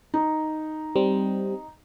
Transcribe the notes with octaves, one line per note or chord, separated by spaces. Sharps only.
D#4
G3 C4